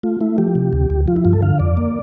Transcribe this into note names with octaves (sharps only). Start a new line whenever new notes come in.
A3 F4
A3 E4
F3 G4
C3
D2
D2
F3 F4
E4
G2 F4
A4
D3 F5
F2 D5
A#3